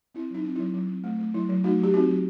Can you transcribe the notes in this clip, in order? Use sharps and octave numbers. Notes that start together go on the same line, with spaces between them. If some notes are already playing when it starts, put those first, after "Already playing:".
C4 E4
F#3 D#4
C4
F#3 E4
F#3
C4
A3
A3
F#3 E4
F#3
A3 D#4 F#4
F#3
G4
C4 D#4 F#4
F#3